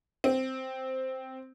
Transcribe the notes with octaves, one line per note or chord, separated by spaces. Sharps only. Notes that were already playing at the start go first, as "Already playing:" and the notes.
C4